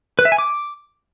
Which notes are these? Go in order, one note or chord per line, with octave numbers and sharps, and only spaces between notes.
B4
E5
G#5
D6